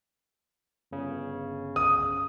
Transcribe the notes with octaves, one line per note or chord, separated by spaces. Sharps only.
G1 C#3
D#6